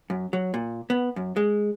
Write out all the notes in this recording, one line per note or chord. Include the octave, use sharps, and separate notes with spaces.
F#2
F#3
A#2
B3
F#2
G#3